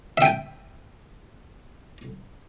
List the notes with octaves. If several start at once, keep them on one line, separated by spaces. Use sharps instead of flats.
E5 G5